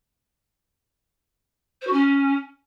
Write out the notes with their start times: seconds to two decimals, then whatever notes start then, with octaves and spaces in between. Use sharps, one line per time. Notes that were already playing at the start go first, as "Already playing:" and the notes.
1.81 C5
1.86 F#4
1.92 C#4